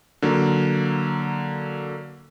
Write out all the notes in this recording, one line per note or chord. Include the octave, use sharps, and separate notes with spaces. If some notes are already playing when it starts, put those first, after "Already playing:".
D3 F#3 A#3